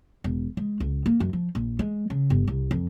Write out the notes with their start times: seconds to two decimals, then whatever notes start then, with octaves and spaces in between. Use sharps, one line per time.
0.24 E1
0.57 G#3
0.80 C#2
1.06 A#3
1.20 F#2
1.33 F3
1.55 A#1
1.79 G#3
2.10 C#3
2.30 G1
2.47 C2
2.71 F2